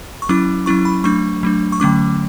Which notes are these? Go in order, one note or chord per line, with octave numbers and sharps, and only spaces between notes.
C#6
F#3 C#4 E4 D6
F#3 C#4 E4 C#6
B5
F#3 A3 D4 C#6
F#3 A3 D4
C#6
D3 F#3 A3 C#4 D6